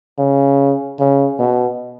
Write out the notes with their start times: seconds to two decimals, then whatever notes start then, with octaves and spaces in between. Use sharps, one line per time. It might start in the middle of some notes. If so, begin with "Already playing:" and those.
0.19 C#3
0.99 C#3
1.39 B2